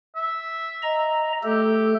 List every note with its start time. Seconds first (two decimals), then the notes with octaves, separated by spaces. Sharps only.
0.16 E5
0.83 D#5 A#5
1.43 A3 G4 A4